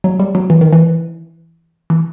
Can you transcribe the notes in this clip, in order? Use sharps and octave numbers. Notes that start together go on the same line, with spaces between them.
F#3
G3
F#3
E3
D#3
E3
E3